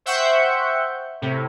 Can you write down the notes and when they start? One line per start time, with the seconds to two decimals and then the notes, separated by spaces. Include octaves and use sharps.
0.06 C5 E5 F#5 G5 C#6 G6
1.22 A2 C3